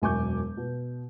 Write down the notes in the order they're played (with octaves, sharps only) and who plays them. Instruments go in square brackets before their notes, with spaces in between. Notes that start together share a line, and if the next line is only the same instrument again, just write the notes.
[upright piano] E1 F#2 G#5 C#6 D6 G6
B2